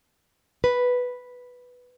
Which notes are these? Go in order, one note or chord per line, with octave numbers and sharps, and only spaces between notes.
B4